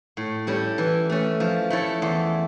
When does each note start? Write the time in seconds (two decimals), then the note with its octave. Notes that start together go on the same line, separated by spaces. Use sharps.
0.17 A2
0.47 G3 C#4 E4 A4
0.78 E3
1.09 A3 C#4
1.40 F3
1.70 A3 E4 A4 C#5
2.02 E2